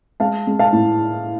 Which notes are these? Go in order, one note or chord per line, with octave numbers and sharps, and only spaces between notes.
G#3 F5 A5
G#3
F5 A5
A2